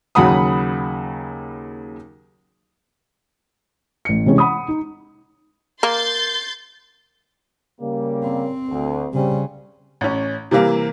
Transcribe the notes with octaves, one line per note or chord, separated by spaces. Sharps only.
D#2 C#3 F#3 F#5 B5 D#6
A1 C#7
C3 E3 G#3 C#4
F#5 B5 D#6
D#4
A#3 C6 G6 A6
C#3 G3 A#3
C4
D2
C#3 G3 C4 C#4
A1 C#4
C3 E3 G3 A#3